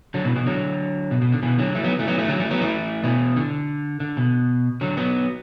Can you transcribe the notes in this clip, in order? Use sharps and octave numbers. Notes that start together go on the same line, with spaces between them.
D3 F#3
B2 E3
B2 E3
D3 F#3
B2
B2
D3
B2 E3
D3 F#3
E3 A3
F#3 B3
E3 A3
F#3 B3
E3 A3
D3 F#3
E3 A3
F#3 B3
E3 A3
B2 E3
D3
D3
B2
D3 F#3
F#3 B3